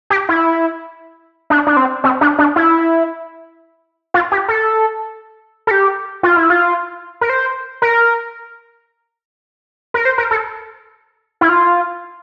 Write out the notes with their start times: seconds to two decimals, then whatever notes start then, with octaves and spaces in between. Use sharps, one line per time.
0.10 G4
0.29 E4
1.50 D4
1.67 D4
1.77 C4
2.04 C4
2.21 D4
2.39 D4
2.56 E4
4.14 F4
4.32 G4
4.48 A4
5.67 A4
5.71 G4
6.23 F4
6.37 E4
6.50 F4
7.21 A#4
7.29 C5
7.82 A#4
9.94 A#4
10.05 C5
10.18 A#4
10.31 A4
11.41 E4
11.49 F4